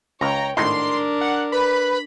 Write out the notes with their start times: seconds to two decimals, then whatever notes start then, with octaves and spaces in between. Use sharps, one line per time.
0.21 C#2 C#5 G5 A#5
0.57 G#1 A2 D4 D#4 A#4 C6
1.21 F#5
1.52 B4 B5